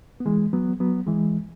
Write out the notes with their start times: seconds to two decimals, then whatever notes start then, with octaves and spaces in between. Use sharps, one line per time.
0.20 B3
0.26 E3 G#3
0.53 F#3 B3
0.80 F#3 B3
1.07 E3 G#3